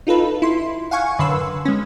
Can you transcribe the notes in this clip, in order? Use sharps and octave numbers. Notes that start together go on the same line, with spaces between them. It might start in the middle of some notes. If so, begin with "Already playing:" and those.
D#4 F4 A4 B4
E4 C6
F5 F#5 G#5 C#6
F#2 D3 B4 C6 E6
G#3 C#4